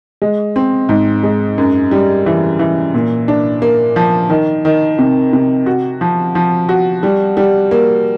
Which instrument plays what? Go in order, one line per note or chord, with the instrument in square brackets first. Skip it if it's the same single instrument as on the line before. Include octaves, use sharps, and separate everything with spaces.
[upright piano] G#3
C4
G#2
G#3
F#2
G3
E3
E3
A#2
D4
A#3
F3
D#3
D#3
C3
C3
F#4
F3
F3
F#4
G3
G3
A#3